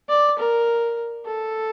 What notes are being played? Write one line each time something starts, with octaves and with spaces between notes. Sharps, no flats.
D5
A#4
A4